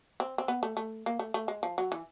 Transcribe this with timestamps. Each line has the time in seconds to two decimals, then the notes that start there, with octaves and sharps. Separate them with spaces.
0.20 C4
0.38 C4
0.48 B3
0.63 A3
0.77 A3
1.06 A#3
1.19 A3
1.34 A3
1.48 G#3
1.63 F3
1.78 F#3
1.92 E3